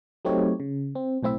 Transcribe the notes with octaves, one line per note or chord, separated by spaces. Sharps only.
F#3 A3 C4 D#4 G4 C#5
C#3
C4
B1 A2 C4 E4 E5